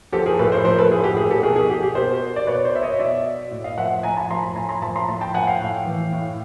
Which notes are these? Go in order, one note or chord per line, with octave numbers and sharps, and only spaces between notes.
F3 G4 A4
G#4 A#4
A2 A4 B4
A#4 C5
F3 A#4 C5
A4 B4
A2 G#4
G4
F3 G#4
G4 A4
B2 G#4 A#4
G#4
G4
G4
B2 A#4 C5
D5
B2 B4 C#5
C5 D5
E5
C#5 D#5
B2 D5 E5
A2
D#5 F5
F3 E5 F#5
A2 G#5 A#5
A5 B5
F3 A#5 C6
A5 B5
A2 G#5 A#5
A#5 C6
F3 A5 B5
A#5 C6
A2 A5 B5
G5 A5
F3 F#5 G#5
F5 G5
A2
E3
A2